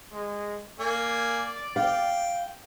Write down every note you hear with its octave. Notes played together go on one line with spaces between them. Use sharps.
G#3
A#3 D5 G#5
F5 G5